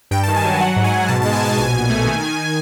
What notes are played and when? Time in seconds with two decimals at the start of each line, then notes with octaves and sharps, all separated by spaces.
0.11 G2 G5
0.23 A5
0.28 D#3
0.36 G#5
0.45 F#3
0.60 F#3 F#5
0.76 G#2
0.84 G#5
0.92 G#2
1.08 B2 A5
1.22 A5
1.25 G#3
1.33 G#5
1.42 B2 A5
1.58 A#1 G#5
1.74 A#1
1.90 A3
2.06 D#3
2.23 D#3